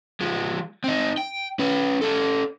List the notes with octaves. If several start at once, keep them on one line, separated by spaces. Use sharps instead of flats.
F3 G#3
C4 D#4
G5
C#4 B4
C#4 A4